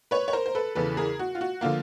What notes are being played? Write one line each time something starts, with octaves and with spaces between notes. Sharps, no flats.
B4 C#5
C#5
A#4 C5
C5
A4 B4
E2 C#3 E3 A4 B4
G#4 A#4
F#4
F4
F#4
D3 F3 A#3 F4